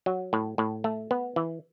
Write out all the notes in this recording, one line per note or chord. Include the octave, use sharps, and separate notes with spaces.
F#3
A2
A2
A3
B3
E3